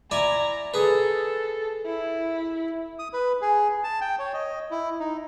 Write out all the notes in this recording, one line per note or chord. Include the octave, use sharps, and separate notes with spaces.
E4 D5 G#5 A#5
G#4 A4 B4
E4
D#6
B4
G#4
A5
G5
C#5
D#5
E4
D#4